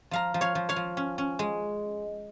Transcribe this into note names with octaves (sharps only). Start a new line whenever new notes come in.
F3 F5 A#5
F3
C#5 F5
F3
C#5 F5
F3
C#4
C#4
G#3